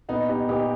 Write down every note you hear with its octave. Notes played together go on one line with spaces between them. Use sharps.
A#2 B3 D#4
D#4 G4
A#2 D#4 G4